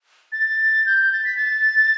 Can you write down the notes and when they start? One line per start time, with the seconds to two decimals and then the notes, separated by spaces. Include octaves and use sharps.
0.32 A6
0.86 G6
1.12 A6
1.25 B6
1.37 A6